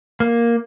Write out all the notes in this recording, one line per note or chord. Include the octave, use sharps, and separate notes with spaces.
A#3